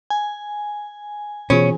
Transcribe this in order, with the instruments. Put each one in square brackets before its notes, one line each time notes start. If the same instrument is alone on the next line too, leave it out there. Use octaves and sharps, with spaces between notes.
[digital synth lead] G#5
[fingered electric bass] B2 [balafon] E3 F4 G#4 [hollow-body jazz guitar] C#4